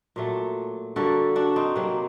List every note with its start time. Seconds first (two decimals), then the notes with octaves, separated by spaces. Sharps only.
0.16 A#2 F#3 A3
0.96 D3 G3 A#3 F#4 A4
1.36 D4 F#4
1.56 C4 D#4
1.76 C3 F#3 A#3 C4